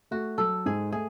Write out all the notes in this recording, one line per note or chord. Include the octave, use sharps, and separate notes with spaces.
A3 F#4
F#3 A4
G#2 G#4
A3 G#4